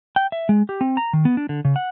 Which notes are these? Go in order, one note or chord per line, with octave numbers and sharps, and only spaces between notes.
G5
E5
G#3
G4
C4
A#5
D#3
B3
D4
D3
C#3
F#5